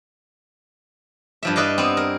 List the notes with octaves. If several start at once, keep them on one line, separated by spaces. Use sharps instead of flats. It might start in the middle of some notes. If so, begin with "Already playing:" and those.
G2 F3 E5
E4 B4 D5 D#5 F5
B3 C4
A#4